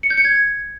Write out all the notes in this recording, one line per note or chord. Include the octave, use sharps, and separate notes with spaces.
C#7
G6
C#7
G#6